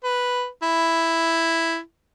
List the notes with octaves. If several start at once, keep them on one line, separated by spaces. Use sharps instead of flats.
B4
E4